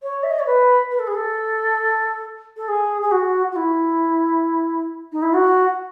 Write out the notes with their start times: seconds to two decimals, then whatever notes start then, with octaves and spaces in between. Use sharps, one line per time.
0.02 C#5
0.23 E5
0.30 D#5
0.39 C#5
0.46 B4
0.91 B4
0.99 A4
1.07 G#4
1.14 A4
2.56 A4
2.68 G#4
3.02 G#4
3.11 F#4
3.51 F#4
3.56 E4
5.12 D#4
5.22 E4
5.33 F#4